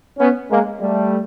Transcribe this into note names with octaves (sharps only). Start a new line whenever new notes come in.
B3 C#4
G#3 A#3
G3 A3